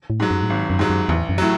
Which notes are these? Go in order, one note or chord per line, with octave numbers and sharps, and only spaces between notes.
A2
G#2 F#3
F#2
A2
G#1 G#2
F#2
G#2 F#3
F#2
A1 E2
F#2
A2 F#3